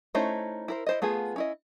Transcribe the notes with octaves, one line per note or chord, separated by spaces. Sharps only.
A3 C#4 D#4 E4 C5
E4 A#4 C5
E4 C5 D#5
A3 B3 F4 G#4
C#4 E4 D#5